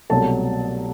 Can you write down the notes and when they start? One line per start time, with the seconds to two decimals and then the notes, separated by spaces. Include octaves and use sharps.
0.10 C2 B2 F#3 A3 A5